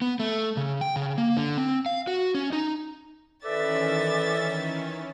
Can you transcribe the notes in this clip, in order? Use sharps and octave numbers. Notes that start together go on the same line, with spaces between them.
B3
A3
C#3
G5
C#3
A#3
D3
C4
F5
F#4
C#4
D#4
D#3 E3 C#4 A4 B4 D5 E5 A6